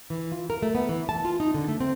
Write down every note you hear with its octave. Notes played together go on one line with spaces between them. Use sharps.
E3
F4
A#4
A3
B3
E3
A5
F4
D#4
D3
A3
C4